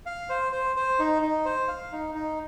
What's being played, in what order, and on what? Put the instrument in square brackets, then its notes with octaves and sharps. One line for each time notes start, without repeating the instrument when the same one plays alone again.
[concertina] F5
C5
C5
C5
D#4
D#4
C5
F5
D#4
D#4